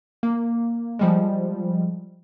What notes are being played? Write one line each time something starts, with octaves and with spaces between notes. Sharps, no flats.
A#3
F3 G3 G#3